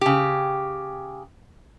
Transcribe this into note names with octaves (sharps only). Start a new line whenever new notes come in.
C#3 G4